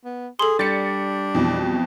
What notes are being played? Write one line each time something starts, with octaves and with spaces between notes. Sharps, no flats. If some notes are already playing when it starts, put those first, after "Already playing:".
B3
G#4 A4 C6
G3 D4 A6 C#7
F2 B2 E3